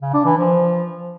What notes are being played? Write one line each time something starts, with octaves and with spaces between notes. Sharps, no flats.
C#3
D4
E3
F3